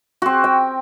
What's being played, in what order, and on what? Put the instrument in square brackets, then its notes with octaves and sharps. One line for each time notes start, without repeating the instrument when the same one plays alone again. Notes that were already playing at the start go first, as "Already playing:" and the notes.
[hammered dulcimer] C4 F#4
G5